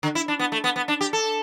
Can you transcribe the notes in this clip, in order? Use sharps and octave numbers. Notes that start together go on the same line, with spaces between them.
D3
E4
D4
B3
A3
B3
B3
D4
G4
A4